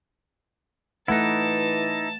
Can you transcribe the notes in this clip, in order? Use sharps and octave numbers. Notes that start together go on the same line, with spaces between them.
E3 A3 D#4 E4 F#5 A5